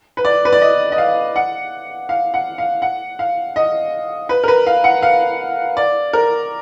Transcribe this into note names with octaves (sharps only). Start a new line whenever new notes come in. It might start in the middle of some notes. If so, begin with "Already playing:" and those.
B4
D5
B4
D5
D#5
D#5
F5
F#5
F5
F#5
F5
F#5
F5
D#5
B4
A#4
B4
F5
F#5
F5
D5
A#4